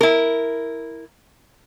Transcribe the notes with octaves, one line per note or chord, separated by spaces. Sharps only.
E4 A#4